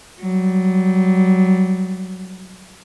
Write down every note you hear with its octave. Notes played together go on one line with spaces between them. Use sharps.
F#3 G3